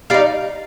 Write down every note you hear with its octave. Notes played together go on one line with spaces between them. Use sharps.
G3 C4 D#4 D5 F5